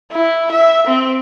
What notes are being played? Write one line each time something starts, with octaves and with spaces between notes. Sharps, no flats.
E4
E5
C4